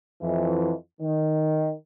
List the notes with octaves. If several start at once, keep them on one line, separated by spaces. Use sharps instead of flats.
F2 E3
D#3